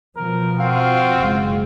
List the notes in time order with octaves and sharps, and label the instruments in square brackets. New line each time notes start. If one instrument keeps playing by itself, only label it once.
[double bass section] B2 F3 [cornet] A#4
[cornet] C4 [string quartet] F4 F#4 [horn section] F5
[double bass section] F#1 G#3